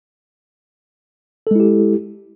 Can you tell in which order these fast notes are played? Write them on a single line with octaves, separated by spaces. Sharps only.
A4 G#3 E4 G4